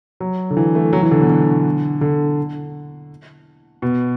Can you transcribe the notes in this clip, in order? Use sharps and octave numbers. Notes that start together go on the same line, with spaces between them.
F#3
D3
E3
A3
F#3
E3
D3
B2
D3
D3
B2